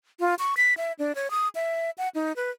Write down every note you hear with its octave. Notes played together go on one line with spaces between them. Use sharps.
F4
C#6
B6
E5
D4
C#5
D#6
E5
F#5
D#4
B4